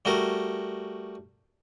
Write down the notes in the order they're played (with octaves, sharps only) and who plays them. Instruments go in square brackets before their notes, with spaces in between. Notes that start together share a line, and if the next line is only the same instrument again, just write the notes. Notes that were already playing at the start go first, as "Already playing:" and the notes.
[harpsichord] G3 A3 F#4 A#4